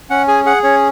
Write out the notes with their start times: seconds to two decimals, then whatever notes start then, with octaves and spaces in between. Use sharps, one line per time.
0.10 C#4 F#5
0.28 G#4 G#5
0.45 G#4 F#5
0.63 C#4 C#5